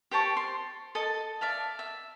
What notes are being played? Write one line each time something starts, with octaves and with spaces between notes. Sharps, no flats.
G4 C5 A5 C#6
C6
A4 D#5 A5
D5 E5 F5 A5
E5